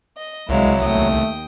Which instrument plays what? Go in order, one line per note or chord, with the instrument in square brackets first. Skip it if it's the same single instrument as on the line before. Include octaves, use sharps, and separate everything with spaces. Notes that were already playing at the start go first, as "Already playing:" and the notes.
[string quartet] D#5
[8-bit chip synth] C2 [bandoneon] F#3 [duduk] G#3 [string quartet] E4 F5
[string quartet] D#2 G5 D#6 [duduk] A3